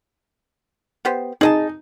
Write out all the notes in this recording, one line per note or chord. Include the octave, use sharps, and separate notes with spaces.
B3 G4 C5
D#4 G#4 D#5 A5